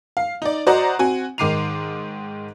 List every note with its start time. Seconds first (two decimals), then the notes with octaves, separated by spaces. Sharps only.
0.17 F5
0.42 D#4 D5
0.67 F#4 C5 D5 D#5 F#5 A#5
0.99 C4 F#4 G#5
1.38 G#2 D#3 D6 C7 D#7 F7